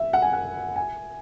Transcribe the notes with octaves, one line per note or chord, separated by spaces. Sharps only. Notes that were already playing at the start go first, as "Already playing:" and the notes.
Already playing: E5
F#5
G#5
F#5
G#5